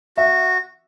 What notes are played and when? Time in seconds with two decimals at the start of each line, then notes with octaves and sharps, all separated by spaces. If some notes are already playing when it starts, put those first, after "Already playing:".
0.17 F#4 E5